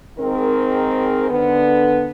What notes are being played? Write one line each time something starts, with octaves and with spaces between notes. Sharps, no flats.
G#2 D#3 C4 G#4 A#4
D3 B3